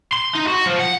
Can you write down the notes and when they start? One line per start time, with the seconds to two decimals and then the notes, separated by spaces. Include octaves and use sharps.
0.13 C6
0.35 D#4
0.48 F#4
0.67 F3
0.80 F#5